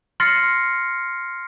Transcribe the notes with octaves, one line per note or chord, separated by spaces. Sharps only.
C6 F6 A6 A#6 C7 C#7